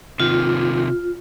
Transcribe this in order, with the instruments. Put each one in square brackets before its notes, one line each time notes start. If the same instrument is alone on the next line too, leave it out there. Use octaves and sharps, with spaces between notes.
[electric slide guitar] C3 D#3 [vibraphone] F4